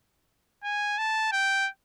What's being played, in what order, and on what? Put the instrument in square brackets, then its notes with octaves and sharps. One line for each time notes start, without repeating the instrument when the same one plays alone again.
[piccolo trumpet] G#5
A5
G5